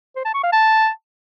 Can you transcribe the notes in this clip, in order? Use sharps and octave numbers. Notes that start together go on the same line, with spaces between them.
C5
A5
C#6
F5
A5